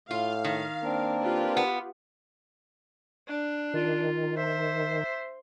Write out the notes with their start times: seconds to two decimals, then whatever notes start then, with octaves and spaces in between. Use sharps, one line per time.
0.11 A2 F4 F5
0.45 D#3
0.83 A#3 C4 D4 A#4
1.23 F4 G4 B4
1.57 B3
3.28 D4
3.74 D#3 F4
4.37 C5 E5